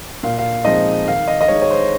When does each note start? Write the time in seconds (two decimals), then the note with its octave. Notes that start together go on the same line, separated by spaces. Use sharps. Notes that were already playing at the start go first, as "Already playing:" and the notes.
0.23 A#2 F5
0.38 F5
0.64 F3 G#3 C4 D#4 D#5
1.07 D#3 F5
1.28 D#5
1.41 D#5
1.48 G#3 D#4 C#5
1.62 C#5
1.70 C5